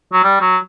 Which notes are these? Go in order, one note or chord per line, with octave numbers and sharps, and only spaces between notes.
F#3
G3
F#3